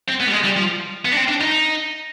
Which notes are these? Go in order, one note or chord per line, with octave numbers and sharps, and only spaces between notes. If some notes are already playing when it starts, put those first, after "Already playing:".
C4
B3
G3
G#3
G3
F3
B3
D4
C4
D4
D#4